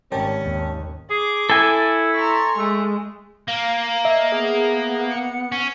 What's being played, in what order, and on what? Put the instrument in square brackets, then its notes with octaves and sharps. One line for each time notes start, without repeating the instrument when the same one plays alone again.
[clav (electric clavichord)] G#1 G3 [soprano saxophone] C#4 [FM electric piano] A#4 G5 A5
[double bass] D#2
[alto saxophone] G#4 [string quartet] D6
[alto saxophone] E4 [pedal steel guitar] A4 G#5
[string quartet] A#5 C6 C#6
[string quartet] G#3 [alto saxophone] A3
[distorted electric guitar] A#3 [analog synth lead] F5
[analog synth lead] D#5 [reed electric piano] E5
[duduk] B3 [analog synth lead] G#4
[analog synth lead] C#7
[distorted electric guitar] C#4